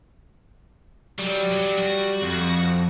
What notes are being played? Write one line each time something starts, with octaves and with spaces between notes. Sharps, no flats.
F#3 G3
F#3
F#4
F2